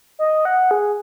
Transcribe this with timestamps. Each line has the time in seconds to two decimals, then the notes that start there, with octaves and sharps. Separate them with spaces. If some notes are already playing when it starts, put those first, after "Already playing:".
0.19 D#5
0.45 F#5
0.71 G#4